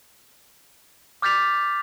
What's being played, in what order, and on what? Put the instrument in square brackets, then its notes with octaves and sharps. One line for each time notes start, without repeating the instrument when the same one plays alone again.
[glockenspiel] D6 F6 G6 A6 B6 F7